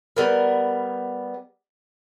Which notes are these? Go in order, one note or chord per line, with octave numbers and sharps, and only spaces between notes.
G3 B3 A#4